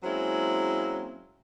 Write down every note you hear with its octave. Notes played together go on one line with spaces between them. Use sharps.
F#3 G#3 A#3 C4 C#4 E4